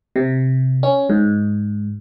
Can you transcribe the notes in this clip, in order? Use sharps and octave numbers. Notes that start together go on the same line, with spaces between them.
C3
C#4
G#2